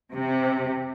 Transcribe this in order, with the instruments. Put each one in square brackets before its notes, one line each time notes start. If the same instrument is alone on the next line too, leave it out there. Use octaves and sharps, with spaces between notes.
[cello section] C3